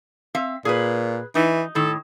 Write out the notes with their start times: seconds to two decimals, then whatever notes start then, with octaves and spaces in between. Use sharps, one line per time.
0.35 C4 E5 F5
0.65 A#2 G#4 B4
1.35 E3 D#4
1.75 A2 D#3 A4